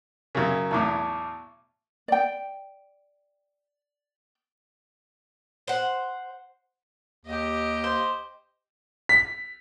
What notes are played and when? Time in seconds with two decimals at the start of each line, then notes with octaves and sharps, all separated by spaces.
0.35 F#2 C#3 A#4 A#5
0.71 B1 E2 A2 A5 C#6 D6
2.08 D5 G5
5.68 C5 F#5
7.25 D#2 G4 D#5
7.84 C5
9.09 B6